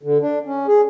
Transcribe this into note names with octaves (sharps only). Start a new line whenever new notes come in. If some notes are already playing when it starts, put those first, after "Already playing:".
D3
D4
C#4
G#4